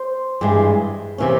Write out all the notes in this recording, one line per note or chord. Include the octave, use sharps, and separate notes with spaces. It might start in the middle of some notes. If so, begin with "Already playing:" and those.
Already playing: C5
G2 E3 G#3
C3 E3 A#3 C#4